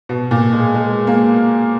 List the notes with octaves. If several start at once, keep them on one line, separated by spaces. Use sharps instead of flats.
B2
A#2
G#3
G#3
A#3